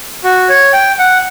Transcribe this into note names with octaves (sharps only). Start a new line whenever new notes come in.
F#4
C#5
G5
F#5